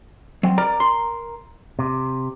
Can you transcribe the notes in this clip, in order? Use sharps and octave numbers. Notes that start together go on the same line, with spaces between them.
F#3 C4
A#4 D5
C6
C3